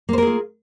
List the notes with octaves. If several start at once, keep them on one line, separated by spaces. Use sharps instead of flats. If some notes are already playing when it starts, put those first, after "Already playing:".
A#3 F4 G#4 A#4 C5